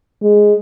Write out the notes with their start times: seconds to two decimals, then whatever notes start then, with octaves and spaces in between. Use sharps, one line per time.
0.22 G#3